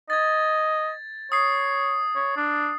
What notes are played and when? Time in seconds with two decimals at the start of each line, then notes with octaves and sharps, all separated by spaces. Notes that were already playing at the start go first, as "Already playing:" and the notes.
0.10 D#5 G#6 A6
1.32 C#5 D#6 C7
2.15 C#5
2.36 D4